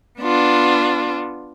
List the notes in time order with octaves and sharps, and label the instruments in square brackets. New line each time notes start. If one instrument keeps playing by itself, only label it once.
[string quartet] B3 D4 F4